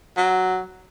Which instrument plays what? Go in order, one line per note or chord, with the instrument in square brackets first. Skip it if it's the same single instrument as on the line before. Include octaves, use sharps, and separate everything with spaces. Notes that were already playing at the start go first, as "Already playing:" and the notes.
[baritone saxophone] F#3